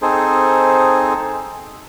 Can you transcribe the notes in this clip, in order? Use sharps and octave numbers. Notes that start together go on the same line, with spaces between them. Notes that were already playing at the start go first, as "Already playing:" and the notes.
C4 D#4 G#4 A4 C5